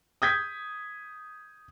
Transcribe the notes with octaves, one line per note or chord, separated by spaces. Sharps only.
D#6 G6 G#6 B6